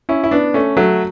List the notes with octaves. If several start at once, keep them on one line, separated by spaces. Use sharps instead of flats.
C#4 E4
E4
B3 D4
A3 C#4
F#3 A3